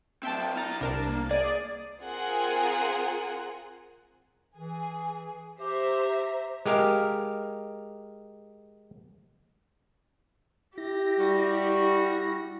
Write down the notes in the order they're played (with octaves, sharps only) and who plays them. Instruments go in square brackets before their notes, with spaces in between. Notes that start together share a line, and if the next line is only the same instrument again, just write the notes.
[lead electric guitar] F#3 C4 [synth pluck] E5 G5 A5
[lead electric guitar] E4 A#5 [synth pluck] F6 A6
[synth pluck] C2 A#4 A5 [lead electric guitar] D4
[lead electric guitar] A#3
[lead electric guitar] G#4 [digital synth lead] D5
[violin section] C4 F4 G#4 A#4 F#5 G#5
[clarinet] E3 [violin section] G#4
[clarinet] G4 [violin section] C5 E5 A#5
[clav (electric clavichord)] G#3 G4 A#4 F5
[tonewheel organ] E4 A#6 [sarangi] G4
[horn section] G3 F#4